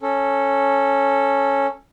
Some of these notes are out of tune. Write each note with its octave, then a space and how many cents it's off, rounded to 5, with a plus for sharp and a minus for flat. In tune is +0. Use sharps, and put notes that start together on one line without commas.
C#4 -10 A4 +0